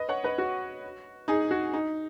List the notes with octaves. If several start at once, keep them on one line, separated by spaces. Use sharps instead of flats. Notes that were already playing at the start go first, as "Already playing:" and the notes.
Already playing: B4 D#5
C#5 F#5
B4 D#5
F#4
D#4 G#4
F#4
D#4